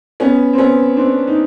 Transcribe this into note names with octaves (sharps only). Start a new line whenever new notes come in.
B3 C#4
C4
B3 C#4
C4 D4
D#4